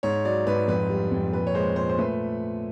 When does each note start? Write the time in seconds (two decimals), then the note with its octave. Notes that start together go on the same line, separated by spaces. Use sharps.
0.03 G#2 C#5
0.25 F#3 D5
0.47 G#2 B4
0.68 F2 B4
0.90 G3
1.12 F2
1.32 A#2 B4
1.47 C#5
1.55 G#3 C5
1.76 A#2 C5
1.89 C5
1.98 A3 B4